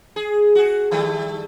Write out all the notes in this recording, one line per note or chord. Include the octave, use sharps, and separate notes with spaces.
G#4
F#4 G#4
D#3 G3 A3